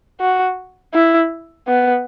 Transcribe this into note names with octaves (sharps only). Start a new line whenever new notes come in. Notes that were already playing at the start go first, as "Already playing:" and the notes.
F#4
E4
B3